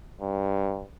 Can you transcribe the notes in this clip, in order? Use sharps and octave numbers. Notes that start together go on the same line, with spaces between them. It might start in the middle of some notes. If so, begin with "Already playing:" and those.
G2